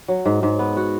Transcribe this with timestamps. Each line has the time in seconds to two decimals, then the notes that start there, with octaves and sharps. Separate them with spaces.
0.08 F#3
0.26 G#2
0.43 G#2
0.59 B3
0.77 F#4